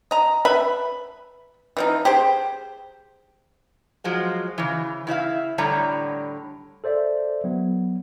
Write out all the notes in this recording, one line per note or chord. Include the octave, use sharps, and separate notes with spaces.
D#5 A#5
B4 E5 B5
E3 F3 D#4
G4 G#4 C5
F3 F#3 G#3
C#3 E3
C#3 E4 E5 F5
A2 D3 G3 C#5 A#5
A4 C5 D5 E5
F#3 B3